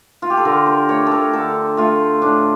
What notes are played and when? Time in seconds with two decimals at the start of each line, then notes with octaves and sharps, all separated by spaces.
0.22 F4
0.30 G4
0.37 A4
0.45 D3 A#4
0.66 A#4
0.89 A3 C#5
1.07 A4
1.12 A#4
1.33 D3 A4
1.77 A3 F4
2.22 A2 D4